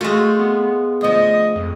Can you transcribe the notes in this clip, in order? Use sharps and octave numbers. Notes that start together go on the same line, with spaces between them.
G#3 A3 F4 F#4
B3
D2 F3 D#5
F2